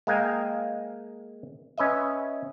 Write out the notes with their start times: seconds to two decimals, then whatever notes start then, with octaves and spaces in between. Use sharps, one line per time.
0.07 G#3 A#3 F5 G5 G#5
1.78 C#4 B4 D#5 E5